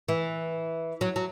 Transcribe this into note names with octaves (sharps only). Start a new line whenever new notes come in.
E3
F#3
F#3